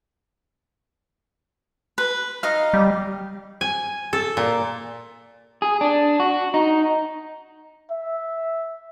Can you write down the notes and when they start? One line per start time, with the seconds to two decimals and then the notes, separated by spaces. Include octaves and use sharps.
1.98 B4
2.43 D#4 D#5 F5
2.73 G3
3.61 G#5
4.13 A4
4.37 A#2
5.62 G#4
5.81 D4
6.20 F#4
6.54 D#4
7.91 E5